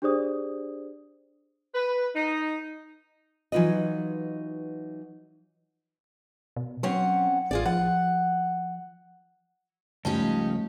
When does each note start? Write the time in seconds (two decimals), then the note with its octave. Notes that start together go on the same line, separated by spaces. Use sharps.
0.02 D4 G4 G#4 C5 D5 D#6
1.74 B4
2.15 D#4
3.52 E3 F#3 D#4 F4 B4 D#5
6.56 B2
6.83 F#3 C4 C#4 F#5
7.51 A1 F4 G#4 D5
7.65 F3 F#5
10.05 C#2 F3 G3 A3 C#4 D#4 G4